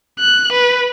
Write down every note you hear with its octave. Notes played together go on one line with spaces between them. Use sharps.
F#6
B4